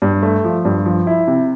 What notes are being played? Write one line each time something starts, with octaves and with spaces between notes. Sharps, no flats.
G2
A3
F3
G2
F3
E4
C3